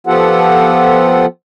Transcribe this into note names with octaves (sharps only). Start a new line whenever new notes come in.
F3 B3 F4 G4 A4 F#5